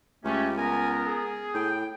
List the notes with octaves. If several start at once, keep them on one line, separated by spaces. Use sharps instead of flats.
C#2 A3 C#4 G4
B3 A#4 G#5
G#4
A2 G5